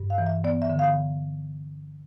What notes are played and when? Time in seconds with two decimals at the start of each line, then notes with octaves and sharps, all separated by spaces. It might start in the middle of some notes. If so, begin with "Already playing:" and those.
Already playing: G2
0.10 F5
0.18 E3
0.26 E5
0.44 B3 D5
0.62 E5
0.70 D3
0.79 F5